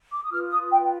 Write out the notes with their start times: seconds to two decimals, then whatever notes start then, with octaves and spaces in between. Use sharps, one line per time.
0.12 D6
0.23 D#6
0.32 F4 B4 F6
0.51 D#6
0.71 G5